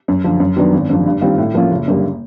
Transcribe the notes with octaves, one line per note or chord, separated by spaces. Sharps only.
F#2
D3 F3
F#2
D#3 F#3 B3 D4
G#1
F#2 D3 F3
G2
D#3 G3 C4 F4
A2
F3 A#3 C#4 F4
F#1
F#2 D3 G3 A#3